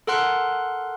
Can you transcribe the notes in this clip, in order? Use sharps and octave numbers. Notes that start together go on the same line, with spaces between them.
A4 A#4 F#5 C6 F#6